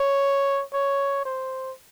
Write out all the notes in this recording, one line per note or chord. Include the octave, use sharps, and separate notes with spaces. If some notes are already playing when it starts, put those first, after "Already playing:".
Already playing: C#5
C#5
C5